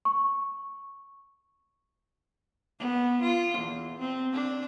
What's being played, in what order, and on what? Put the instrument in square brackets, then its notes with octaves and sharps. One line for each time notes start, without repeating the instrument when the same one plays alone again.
[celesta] C#6
[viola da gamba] B3
F4
E2
C4
D4